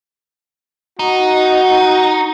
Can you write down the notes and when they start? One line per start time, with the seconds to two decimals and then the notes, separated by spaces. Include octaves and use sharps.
0.99 D#4 F#4